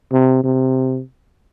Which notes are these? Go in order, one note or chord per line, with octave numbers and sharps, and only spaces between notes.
C3
C3